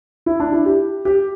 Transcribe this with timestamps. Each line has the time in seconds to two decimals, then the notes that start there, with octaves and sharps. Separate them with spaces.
0.26 E4
0.40 D4
0.52 E4
0.66 G4
1.05 G4